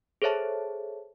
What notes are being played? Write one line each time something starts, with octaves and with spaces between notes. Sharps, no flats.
G#4 A4 C5 C#5 E5 A5